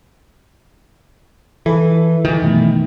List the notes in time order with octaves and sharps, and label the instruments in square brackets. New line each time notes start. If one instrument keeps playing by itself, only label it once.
[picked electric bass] E3 [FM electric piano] A4 B4
[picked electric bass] D#3 E3
[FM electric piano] F#2 B2 A3